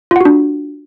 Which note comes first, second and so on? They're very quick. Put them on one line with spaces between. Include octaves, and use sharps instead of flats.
F4 F#5 F#4 D4